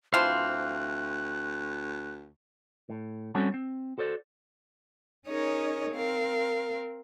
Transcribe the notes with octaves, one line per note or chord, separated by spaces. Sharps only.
D2 E3 F3 C4 F5 F#6
A2
G3 C4 C#4 F#4 A4
C4
F#4 A4 C5 D5
C#4 D#4 G#4 A#4 C#5 D#5
C4 A#4 F5